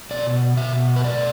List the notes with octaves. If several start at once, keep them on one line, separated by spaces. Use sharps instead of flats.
B2 D5
B2 E5
B4
A3 D5